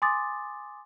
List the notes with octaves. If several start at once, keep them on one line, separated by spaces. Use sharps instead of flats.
G#5 C6 D6 D#6 A6